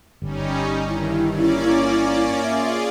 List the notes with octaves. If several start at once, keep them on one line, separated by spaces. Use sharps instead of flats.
G1 G3 C#4 D#4
G2 D#3 E4
A#3 C#4 D5
F4 G#4 D5 E5